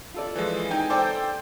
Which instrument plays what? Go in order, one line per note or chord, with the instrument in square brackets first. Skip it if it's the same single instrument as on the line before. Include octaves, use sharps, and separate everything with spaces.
[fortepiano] F4 A4 D5
[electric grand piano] E3 F3 G#3
[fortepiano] D#4 [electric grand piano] G5 G#5 G6
[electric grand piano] A4 C5 D5 [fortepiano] G5 D6